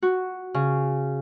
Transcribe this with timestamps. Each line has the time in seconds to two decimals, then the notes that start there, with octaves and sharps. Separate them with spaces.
0.02 F#4
0.54 C#3